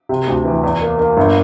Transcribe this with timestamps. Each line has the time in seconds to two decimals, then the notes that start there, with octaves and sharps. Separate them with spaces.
0.09 C3
0.28 D2
0.45 E3
0.63 E2
0.81 A#3
0.99 A#3
1.17 G1